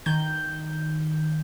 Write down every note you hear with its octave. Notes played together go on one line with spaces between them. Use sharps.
D#3 G6